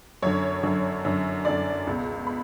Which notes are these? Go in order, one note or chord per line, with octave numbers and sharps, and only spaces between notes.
F#2 D3 C#5
F#2 D3
F#2 D3
F#2 D3 D5
C#2 B2
B5